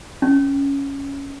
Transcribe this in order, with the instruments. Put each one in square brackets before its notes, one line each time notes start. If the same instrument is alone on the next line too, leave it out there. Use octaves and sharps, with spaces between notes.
[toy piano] C#4